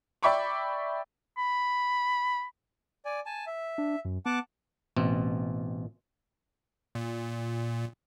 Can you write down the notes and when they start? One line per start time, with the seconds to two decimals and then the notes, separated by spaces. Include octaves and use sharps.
0.23 D5 E5 G5 B5 C#6 D6
1.37 B5
3.05 D5 G#5
3.26 G#5 A5
3.47 E5
3.78 D4
4.05 F#2
4.26 B3 F#5 A5 D6
4.96 A1 B2 C4
6.95 A#2